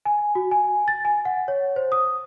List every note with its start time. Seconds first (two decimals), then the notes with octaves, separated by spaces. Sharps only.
0.05 G#5
0.35 F#4
0.51 G#5
0.88 A6
1.05 G#5
1.25 F#5
1.48 C#5
1.76 C5
1.92 D#6